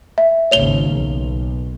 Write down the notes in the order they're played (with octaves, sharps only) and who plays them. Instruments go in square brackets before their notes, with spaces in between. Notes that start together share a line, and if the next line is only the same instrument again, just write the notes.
[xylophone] E5
[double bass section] G#1 D#2 C#3 [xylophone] C#5 F7 G7
[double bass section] B1